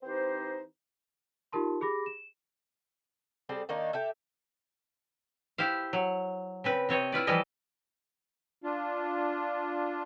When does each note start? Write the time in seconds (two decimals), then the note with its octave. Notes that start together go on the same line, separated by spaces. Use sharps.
0.03 E3 C4 D#4 G4 C5
1.52 D#4 F4 G4 A#4 A5 C6
1.81 G4 G#4 B5 D6 A#6
2.06 E7
3.49 G3 C4 G#4 A4
3.69 D#3 A#3 D4 D#4
3.93 G4 A4 E5
5.58 E4 G4 C5 F5
5.93 F#3
6.64 C#3 C4 B4
6.89 C3 C4 C#5 D#5
7.12 E4 F4 B4 D5
7.27 E3 F3 G3 E4 D#5 A5
8.64 D4 F4